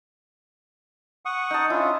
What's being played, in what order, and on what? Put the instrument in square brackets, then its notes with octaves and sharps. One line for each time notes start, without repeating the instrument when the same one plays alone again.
[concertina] F#5 C#6 D#6
[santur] D#4 A5
[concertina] C#4 D4 F4 [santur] E4